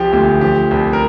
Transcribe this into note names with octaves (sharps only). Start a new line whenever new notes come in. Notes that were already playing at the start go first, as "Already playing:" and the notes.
Already playing: C2 F3 G4
D2 G4
F3 G4
C2
A#4